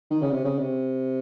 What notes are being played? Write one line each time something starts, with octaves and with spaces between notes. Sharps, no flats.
D#3
C#3
C3
C#3
C3